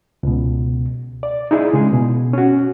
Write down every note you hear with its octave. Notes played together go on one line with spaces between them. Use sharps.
C#2 B2
D5
D#4 E4 G#4 D5
C#3 G#3 G#4
B2
C#4 F#4